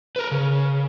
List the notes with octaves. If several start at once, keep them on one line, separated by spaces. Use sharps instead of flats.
A#4 B4
C#3